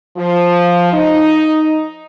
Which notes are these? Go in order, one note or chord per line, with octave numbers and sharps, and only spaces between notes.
F3
D#4